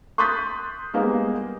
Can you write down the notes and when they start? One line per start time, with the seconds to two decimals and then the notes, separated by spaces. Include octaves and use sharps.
0.18 C6 D#6 F#6 G6 A6 B6
0.94 G3 G#3 A#3 B3